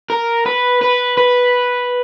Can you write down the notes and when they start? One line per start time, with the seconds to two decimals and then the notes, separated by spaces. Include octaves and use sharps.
0.10 A#4
0.46 B4
0.81 B4
1.17 B4